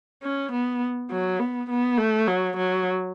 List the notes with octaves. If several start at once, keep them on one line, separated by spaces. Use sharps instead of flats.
C#4
B3
F#3
B3
B3
A3
F#3
F#3